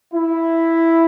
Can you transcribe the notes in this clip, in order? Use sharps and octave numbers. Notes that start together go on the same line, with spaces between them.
E4